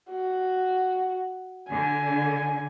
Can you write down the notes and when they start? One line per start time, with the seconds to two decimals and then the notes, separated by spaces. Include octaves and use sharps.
0.11 F#4
1.70 D3 G#5